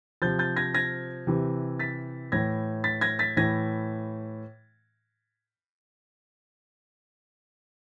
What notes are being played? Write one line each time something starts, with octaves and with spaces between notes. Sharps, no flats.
C3 F3 G6 A6
G6 A6
G#6 A#6
G#6 A#6
C3 E3
A6 B6
A2 E3 G#6 A#6
A6 B6
G#6 A#6
A6 B6
A2 E3 G#6 A#6